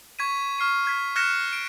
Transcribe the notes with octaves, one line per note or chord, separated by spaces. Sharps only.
C#6 G#6 B6 D#7
C#6 F6 C7 D#7
G#6 B6
F6 F#6 G#6 A#6 C#7 E7
D7